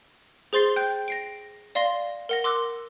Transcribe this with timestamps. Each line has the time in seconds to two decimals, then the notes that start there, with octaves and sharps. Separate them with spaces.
0.53 G#4 C5 C6 A6 C7 G7
0.76 G5 F#6 G6
1.08 A#6 C7 D7
1.75 D5 F5 C6 A#6 G7
2.29 A#4 F#5 A#6
2.44 C6 D6 E6 F#6